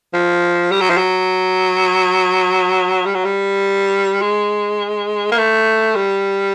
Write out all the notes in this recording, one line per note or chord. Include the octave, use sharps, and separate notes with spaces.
F3
G3
F#3
F3
F#3
G3
F#3
G3
G#3
A#3
A3
G3